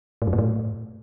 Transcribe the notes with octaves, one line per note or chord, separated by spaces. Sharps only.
A2
F#2
A#2
A2